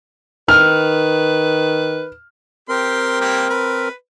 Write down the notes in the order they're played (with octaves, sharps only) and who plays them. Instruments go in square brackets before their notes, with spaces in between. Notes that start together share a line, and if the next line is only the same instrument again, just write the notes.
[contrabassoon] D#3 [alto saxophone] B4 [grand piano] F6
[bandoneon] C4 A#4 [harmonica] G4 C6
[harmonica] G3 A#3 G4
B4